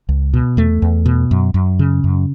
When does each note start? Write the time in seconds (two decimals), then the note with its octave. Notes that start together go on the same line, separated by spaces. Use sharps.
0.09 C#2
0.34 B2
0.57 E2 A3
0.82 E2
1.06 B2
1.31 F#2
1.54 F#2
1.79 C#3
2.04 F#2